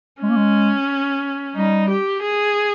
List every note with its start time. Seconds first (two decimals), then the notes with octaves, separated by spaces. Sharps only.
0.22 G#3 C#4
0.30 A#3
0.37 G#3
1.56 G3 D#4
1.89 G4
2.23 G#4